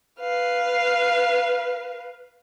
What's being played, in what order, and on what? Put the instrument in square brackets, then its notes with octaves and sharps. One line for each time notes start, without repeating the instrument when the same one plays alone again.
[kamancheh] B4 F5